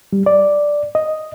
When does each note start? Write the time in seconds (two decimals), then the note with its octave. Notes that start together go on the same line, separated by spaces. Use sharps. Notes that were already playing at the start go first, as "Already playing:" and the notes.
0.13 G3
0.26 D5
0.95 D#5